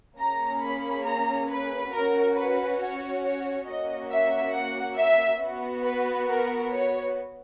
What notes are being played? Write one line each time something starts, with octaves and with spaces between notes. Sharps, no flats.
A#3 C#4 G#4 A#5
B5
A#5
B4
C#4 F#4 A#4
B4
C#5
C#5
A#3 C#4 F#4 D#5
E5
F#5
E5
B3 F#4
B4
A#4
C#5